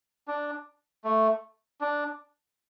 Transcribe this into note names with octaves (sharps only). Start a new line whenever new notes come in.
D4
A3
D4